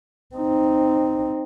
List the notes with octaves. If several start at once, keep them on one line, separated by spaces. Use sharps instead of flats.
C4 D#4